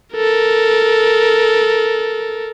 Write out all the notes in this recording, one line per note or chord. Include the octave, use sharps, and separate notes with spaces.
A4 A#4